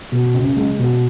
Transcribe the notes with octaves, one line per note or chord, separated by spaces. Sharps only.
B2
C#2
G#3
B2